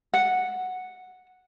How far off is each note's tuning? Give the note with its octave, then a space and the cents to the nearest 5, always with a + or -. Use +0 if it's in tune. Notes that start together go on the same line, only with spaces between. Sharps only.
F#5 -5